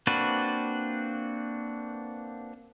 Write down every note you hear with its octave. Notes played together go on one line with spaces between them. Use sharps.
A#3 C4 D4 F#4 B4